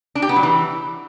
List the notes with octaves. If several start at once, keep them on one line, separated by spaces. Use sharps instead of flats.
D4
G4
B3
F#3
E3